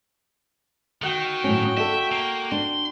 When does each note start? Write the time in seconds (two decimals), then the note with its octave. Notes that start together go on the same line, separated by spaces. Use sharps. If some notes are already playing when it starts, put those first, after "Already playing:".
1.02 D#3 F#4 G5
1.44 A2 F#3 C#4
1.77 A4 D5 E5
2.12 A#3
2.52 D4 C6